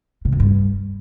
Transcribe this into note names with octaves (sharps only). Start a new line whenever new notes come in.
C3
F2
G2